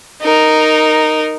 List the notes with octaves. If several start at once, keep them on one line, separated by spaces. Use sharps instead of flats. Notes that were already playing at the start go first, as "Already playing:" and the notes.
D#4 A#4